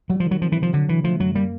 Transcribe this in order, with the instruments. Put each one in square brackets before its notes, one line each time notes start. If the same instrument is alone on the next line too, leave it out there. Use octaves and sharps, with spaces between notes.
[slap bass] F#3 [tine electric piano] G3
[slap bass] F3
[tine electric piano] D#3
[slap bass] F#3
[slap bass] F3 [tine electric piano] C4
[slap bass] E3
[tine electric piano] C3 [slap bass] F3
[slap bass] D3 [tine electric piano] F#3
[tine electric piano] D3 [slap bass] E3
[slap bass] F3 [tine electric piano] A3
[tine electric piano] F#2 [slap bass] F#3
[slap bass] G3 [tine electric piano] A#3